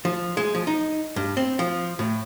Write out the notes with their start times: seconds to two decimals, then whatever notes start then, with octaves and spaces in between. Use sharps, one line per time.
0.05 F3
0.37 G#3
0.55 F3
0.67 D#4
1.16 G2
1.37 C4
1.59 F3
1.99 A2